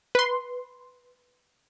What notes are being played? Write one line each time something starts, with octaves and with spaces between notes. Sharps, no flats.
B4 C6